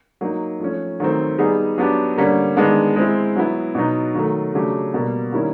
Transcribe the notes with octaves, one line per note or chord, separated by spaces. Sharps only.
F#3 A#3 D#4
F3 A3 C#4
D#3 F#3 A3 C4
G3 B3 D#4 G#4
F#3 B3 D4 G4
D3 G3 A#3 C#4
D#3 G#3 B3 D4
G#3 C4 E4
F#3 B3 E4
B2 F#3 B3 D#4
D#3 F#3 A3
C#3 F#3 A3 D4 G4
B2 G3 A#3
D#3 G3 A#3 C#4 E4